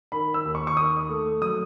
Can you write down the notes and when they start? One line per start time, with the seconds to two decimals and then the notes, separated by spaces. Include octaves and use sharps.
0.12 D#3 B5
0.34 E6
0.45 D#2
0.55 C#6
0.67 C#6
0.77 D#3 D#6
1.09 A3
1.42 F#3 D#6